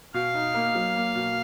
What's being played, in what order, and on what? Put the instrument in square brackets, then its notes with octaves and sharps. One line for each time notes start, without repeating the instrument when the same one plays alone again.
[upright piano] B2 [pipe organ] F5
[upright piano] D#4
A#3
F#3
A#3
B2